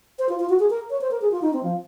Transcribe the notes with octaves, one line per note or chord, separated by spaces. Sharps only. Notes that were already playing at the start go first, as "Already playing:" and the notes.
C5
F4
F4
F#4
G#4
A#4
C#5
C5
A#4
G#4
F4
D#4
C4
F3